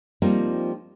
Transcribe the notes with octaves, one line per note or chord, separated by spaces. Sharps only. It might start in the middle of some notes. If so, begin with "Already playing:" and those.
F3 G3 A#3 C4 D#4 F4